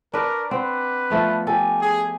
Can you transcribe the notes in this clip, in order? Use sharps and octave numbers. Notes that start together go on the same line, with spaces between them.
D4 A#4 B4 D5 C#6 D6
C4 B4 F#5
F3 A3 B3
G4 A4 G#5
G#4